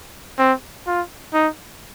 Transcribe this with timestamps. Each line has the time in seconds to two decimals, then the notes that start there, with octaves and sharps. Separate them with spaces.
0.39 C4
0.87 F4
1.34 D#4